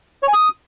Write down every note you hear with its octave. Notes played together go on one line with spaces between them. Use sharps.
C#5
G#5
D#6